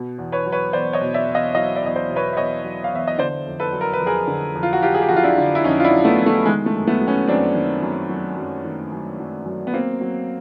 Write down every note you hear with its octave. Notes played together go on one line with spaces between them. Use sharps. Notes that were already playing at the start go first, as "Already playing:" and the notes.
Already playing: B2
E2
B4 C#5
F#3
B4 C#5
E2 C5 D5
C#5 D#5
B2
D5 E5
E2
D#5 F5
F#3 D#5 F5
D5 E5
E2 D#5
C5 D5
B2
B4 C#5
E5
E2 C#5 D#5
F#3
F5
E2 E5
D#5
D3 C5 D5
F2
A4 B4
F#3
A#4
B4
F2
G#4 A#4
D3
F2
F4
F#4
F#3 F4 G4
G#4
G4
F2 F#4
F4
D4 E4
D3
E4
F2 C#4 D#4
F4
D4 E4
F#3
A3 B3
F2
A3
D#3 G#3
A3
F#2
A3 B3
F#3
B3 C#4
F#2 C4 D4
D#3
F#2
F#3
F#2
D#3
F#2
F#3
F#2
B3
F#3 A#3 C4
F#3